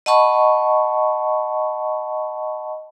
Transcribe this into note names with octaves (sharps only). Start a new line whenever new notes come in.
D#5 F#5 A5 B5 C#6